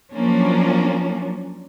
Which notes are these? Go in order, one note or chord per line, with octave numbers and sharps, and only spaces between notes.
F3 F#3 A#3 C#4 D4